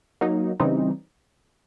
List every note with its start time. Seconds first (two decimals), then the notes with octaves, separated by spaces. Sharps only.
0.21 F#3 A#3 D#4
0.60 C#3 E3 G3 C4 D#4